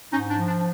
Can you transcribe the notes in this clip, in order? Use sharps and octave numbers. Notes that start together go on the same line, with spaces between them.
G#2 C#4 D#4
D4
F3
D4